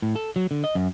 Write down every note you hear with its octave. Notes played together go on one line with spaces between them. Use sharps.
A2
A4
F#3
D3
D#5
F#2